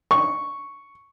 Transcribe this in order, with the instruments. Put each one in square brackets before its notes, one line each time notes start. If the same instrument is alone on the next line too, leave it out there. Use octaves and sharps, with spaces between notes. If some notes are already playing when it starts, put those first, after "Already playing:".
[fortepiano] C#6